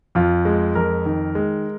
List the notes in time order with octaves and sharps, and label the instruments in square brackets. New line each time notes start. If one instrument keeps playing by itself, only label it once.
[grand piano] F2 F4
G#3
F2 A#4
D#3
G#3